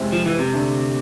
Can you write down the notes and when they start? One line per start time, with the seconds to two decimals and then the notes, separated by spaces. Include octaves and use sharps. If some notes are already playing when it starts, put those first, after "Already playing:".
Already playing: F2 C3 G#3 C4 E4
0.12 F3
0.26 E3
0.39 C3
0.53 D3 A3 D4